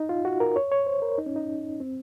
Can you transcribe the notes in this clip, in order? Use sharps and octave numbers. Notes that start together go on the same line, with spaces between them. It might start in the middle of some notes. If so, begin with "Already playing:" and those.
Already playing: D#4
F4
F#4
A#4
C#5
C#5
C5
A#4
D#4
C#4
D#4
C4